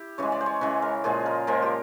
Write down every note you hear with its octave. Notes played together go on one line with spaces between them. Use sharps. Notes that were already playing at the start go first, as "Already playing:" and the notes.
Already playing: E4 G4
C#3 E3 G#3 C#5
D5
C5
C#5
C#3 E3 G#3 B4
A#4
A#2 F3 G#3 G#4
A#4
A#2 F3 G#3 A#4
G4